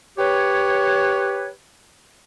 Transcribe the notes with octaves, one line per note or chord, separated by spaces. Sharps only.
G4 B4 C#5